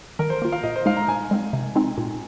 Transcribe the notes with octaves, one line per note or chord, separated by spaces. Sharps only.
D#3 A#4
C5
A#3 F4
F5
A#2 D#5
C5
G#3 D#4 F5
A#5
A#2 G#5
G#3 C4 D#4
C3
G#3 C4 D#4
A#2